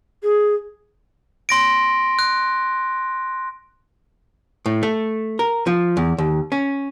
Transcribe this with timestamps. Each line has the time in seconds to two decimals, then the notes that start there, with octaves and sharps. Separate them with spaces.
0.23 G#4
1.49 C6 A#6 D7
2.19 F#6
4.66 A2
4.83 A3
5.39 A#4
5.67 F3
5.97 E2
6.18 D#2
6.52 C#4